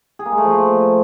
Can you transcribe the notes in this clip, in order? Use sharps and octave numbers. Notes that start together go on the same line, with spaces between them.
G#4
A#3
G#3
A3
F3